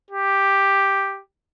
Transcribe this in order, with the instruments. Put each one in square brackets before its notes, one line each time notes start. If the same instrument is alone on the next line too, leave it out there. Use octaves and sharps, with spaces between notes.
[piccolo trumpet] G4